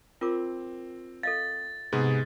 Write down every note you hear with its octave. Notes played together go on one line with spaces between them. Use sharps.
C4 F4 A#4 D6
A4 D#5 F5 A6
G#2 C3 B3 G#4